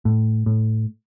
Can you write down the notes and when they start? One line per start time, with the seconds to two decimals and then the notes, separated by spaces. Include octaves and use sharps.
0.05 A2
0.46 A2